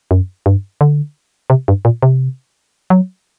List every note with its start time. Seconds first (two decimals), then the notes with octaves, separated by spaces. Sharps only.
0.11 F#2
0.46 G2
0.81 D3
1.50 C3
1.68 G2
1.85 A#2
2.03 C3
2.90 F#3